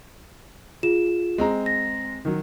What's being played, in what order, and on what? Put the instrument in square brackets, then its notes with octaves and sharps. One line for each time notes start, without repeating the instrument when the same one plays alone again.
[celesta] F4 G#4 E7
[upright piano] G#3 C4 A#5
[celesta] A#6
[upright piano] D#3 F#3